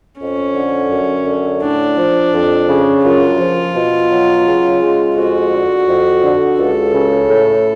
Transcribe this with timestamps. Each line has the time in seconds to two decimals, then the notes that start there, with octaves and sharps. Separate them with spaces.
0.20 F2 C#4
0.55 D3
0.91 F#2
1.26 D3
1.62 A2 D4
1.97 F3
2.33 F2
2.68 C#3
3.04 F#2 F4
3.39 F3
3.75 B2
4.10 F#3
4.46 C#3
4.81 G#3
5.16 F2 F#4
5.52 D3
5.87 F2
6.23 D3
6.58 C#2 A4
6.93 C#3
7.29 A2